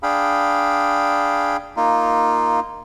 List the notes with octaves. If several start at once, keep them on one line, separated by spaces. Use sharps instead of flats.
D4 G#4 F5 G5 B5
A#3 D#4 F4